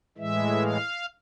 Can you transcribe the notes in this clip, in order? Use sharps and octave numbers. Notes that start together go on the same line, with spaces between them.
A2 E3 G#3 E5
F5